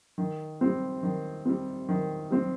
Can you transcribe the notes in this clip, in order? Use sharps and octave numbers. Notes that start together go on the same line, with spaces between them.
D#3
G3 C4
D#3
G3 C4
D#3
G3 C4